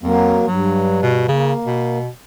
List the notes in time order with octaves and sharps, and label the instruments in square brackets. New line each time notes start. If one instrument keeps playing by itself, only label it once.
[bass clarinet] F2 [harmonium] F#3 A#3
[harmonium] G2 [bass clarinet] F#3
[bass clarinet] B2
[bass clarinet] C#3 [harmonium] A#3
[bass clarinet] B2